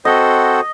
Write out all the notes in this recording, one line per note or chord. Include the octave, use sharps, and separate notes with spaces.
C4 F#4 A4 C5 D#5 F#5